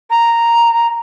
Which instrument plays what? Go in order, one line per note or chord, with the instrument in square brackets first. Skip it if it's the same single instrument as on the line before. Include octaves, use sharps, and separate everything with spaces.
[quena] A#5